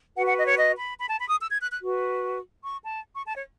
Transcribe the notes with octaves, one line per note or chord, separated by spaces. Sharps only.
F#4 B4 F#5
F#5
D#5
C#5
D#5
B5
B5
A5
B5
D#6
E6
G#6
F#6
F#6
F#4 B4
C#6
A5
C#6
A5
C#5